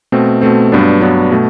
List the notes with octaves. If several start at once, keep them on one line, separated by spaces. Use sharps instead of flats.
B2 A3 C4
B2 A3 C4
G2 F#3 B3 D4
G2 F#3 B3 D4
B2 A3